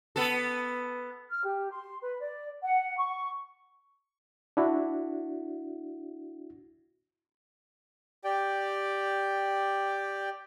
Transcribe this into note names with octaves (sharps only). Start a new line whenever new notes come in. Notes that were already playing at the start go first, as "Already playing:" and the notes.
B3 A4
F6
G4
C6
B4
D5
F#5
C#6
D4 E4 F#4
G4 D5 G5